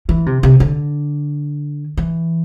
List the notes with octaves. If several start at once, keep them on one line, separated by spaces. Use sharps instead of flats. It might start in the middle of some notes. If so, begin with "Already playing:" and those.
E3
C3
C3
D3
E3